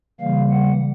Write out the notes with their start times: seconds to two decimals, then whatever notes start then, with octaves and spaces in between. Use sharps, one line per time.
0.20 C#3 E3 G3 A#3 F5
0.51 F#5